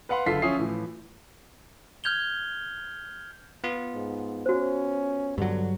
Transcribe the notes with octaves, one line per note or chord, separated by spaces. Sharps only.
B4 F5 F#5 B5 C6
F#1 D3 F4 A4 B6 C7
F3 C#4 F4 E5 D#6 C7
A2 E3 F3
F6 G6 G#6 F7 G7
B3 F4
G#2
C#4 F#4 C5
G2 D3 F#3